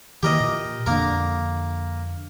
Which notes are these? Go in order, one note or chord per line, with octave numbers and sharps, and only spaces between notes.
D#3 E3 A#3 G4 A#4 D#5
A#2
F2 D3 A#3 A#4